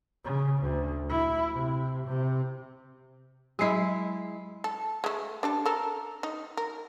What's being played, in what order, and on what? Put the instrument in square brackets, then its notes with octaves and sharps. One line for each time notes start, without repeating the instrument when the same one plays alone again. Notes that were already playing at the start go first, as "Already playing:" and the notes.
[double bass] C#3
D2
E4
C3
C3
[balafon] F#3 D#5 [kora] G#3 E4
[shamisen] A4
G#3 A3
D4 G4 A4
A4 A#4
D#4
A#4